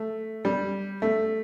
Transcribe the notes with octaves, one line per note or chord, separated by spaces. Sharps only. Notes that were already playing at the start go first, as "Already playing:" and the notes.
Already playing: A3
G3
A3